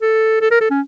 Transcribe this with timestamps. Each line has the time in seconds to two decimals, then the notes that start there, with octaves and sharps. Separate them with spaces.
0.02 A4
0.41 A4
0.51 A#4
0.61 A4
0.70 C#4